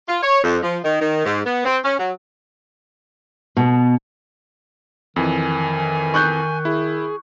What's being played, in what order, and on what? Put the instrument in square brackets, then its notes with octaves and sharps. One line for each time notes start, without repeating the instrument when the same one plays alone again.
[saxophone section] F4
C#5
F2
F3
D#3
D#3
G#2
B3
C4
C#4
F#3
[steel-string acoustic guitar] B2
[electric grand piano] F2 E3 [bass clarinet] D#3 [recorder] G#5
[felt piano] C#6 F#6 G6
[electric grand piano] E4 [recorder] G#4